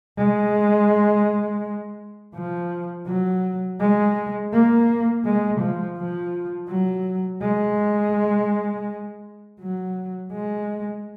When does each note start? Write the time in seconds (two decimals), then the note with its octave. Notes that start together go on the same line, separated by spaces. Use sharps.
0.18 G#3
2.34 F3
3.07 F#3
3.79 G#3
4.53 A#3
5.25 G#3
5.61 F3
5.98 F3
6.69 F#3
7.42 G#3
9.60 F#3
10.32 G#3